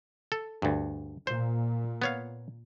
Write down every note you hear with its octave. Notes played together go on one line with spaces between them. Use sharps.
A4
D2 G2
A#2 C5
B3 C#5 F5